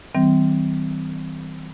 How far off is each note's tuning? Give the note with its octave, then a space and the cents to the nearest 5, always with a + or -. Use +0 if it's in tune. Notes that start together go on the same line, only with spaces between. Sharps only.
D#3 +45 G3 -30 C4 -30